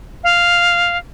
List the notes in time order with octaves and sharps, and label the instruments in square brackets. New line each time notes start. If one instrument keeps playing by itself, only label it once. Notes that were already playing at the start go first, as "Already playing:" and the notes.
[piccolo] F5